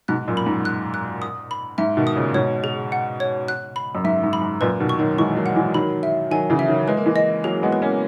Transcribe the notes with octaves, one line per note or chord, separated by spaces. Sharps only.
G#2 B2 F#6
F#2 A#2
B5
G#2
F#6
F#6
D#6
B5
G#2 E5
B2 D#3
D#6
A#2 C#3
G#2 B2 C#5
G#4
F#5
C#5
F#6
B5
F#2
G#2 E5
G#2
B5
G#2
F#2 A#2 B4
B2 D#3
C#6
D#3 F#3
E3 G#3 C#6
F#3 A#3
F#5
E3 G#3
D#3 F#3 B5
E5
D#3 F#3 G#5
C#3 E3
E5
D#3 F#3
G#3 B4
A#3
E3 G#3
D#5
F#3 A#3 G#4
G#3 B3
B4
A#3 C#4